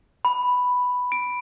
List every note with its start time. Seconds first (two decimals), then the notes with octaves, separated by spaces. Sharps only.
0.25 B5
1.12 D7